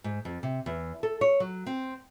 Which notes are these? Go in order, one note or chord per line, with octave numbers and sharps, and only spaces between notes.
G#2
F2
C3
E2
A4
C#5
F#3
C4